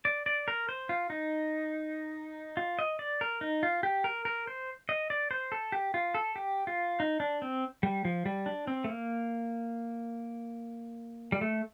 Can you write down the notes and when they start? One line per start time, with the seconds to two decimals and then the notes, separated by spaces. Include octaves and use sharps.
0.05 D5
0.26 D5
0.48 A#4
0.69 C5
0.89 F4
1.10 D#4
2.57 F4
2.79 D#5
2.99 D5
3.21 A#4
3.41 D#4
3.63 F4
3.83 G4
4.04 A#4
4.25 A#4
4.47 C5
4.89 D#5
5.10 D5
5.31 C5
5.52 A4
5.72 G4
5.94 F4
6.14 A4
6.36 G4
6.67 F4
7.00 D#4
7.20 D4
7.42 C4
7.83 G3
8.05 F3
8.26 G3
8.46 D4
8.67 C4
8.84 A3
8.89 A#3
11.32 G3
11.41 A3